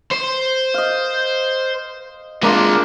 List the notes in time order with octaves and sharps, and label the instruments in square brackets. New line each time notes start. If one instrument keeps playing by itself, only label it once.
[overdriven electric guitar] C5
[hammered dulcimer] D#5 F5
[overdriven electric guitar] G#3 A#4 [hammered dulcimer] A#3 D4 F4